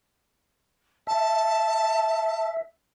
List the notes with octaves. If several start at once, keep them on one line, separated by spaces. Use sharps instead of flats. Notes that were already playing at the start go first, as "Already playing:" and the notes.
E5 A5